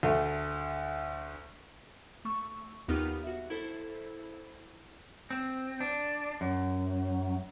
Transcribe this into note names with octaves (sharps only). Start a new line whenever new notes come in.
D2 A3
A3 C#6 E6
D#2 B3 D#4 F4 G4 F6
F#4 E5
E4 A4 C5
C4
D4
F#2